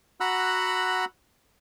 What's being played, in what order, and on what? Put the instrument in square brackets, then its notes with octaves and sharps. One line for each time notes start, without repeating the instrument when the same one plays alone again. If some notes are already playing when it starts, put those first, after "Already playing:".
[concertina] F#4 F#5 A#5 B5 E6 F#6